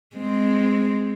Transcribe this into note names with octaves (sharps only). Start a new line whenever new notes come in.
G#3 C4